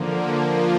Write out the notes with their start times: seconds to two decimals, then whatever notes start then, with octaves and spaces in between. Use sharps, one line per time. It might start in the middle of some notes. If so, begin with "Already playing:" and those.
Already playing: D3 F3 A#3
0.45 F3 A#3 D4 F4